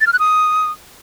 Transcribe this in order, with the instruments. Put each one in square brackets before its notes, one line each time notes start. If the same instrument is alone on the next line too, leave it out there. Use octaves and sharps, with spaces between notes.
[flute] A6
F6
F#6
D#6